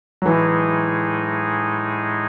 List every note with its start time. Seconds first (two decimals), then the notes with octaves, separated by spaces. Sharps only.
0.22 F#3
0.26 A2 E3 G#3 D#4 G#4